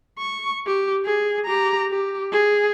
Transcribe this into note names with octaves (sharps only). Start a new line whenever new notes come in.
C#6
G4
G#4
G4 A#5
G4
G#4